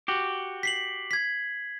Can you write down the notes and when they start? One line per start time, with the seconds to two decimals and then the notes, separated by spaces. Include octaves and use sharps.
0.08 F#4 G4
0.63 B6 C7 F#7
1.11 G#6 B6